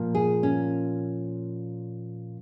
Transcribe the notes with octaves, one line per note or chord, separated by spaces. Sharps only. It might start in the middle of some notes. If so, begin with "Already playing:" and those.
Already playing: A#2 F3 A#3
G#4
C#4